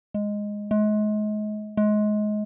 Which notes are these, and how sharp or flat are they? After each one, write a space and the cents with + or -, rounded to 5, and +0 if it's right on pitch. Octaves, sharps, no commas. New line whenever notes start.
G#3 -5
G#3 +35
G#3 +25